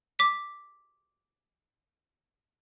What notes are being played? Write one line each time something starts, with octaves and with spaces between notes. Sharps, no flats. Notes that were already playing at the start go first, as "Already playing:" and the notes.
D6 B6